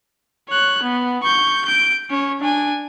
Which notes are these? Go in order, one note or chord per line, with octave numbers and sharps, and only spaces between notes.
C#5 F#6
B3
C#6 G6
G6 D7
C#4 C#5
D4 G#5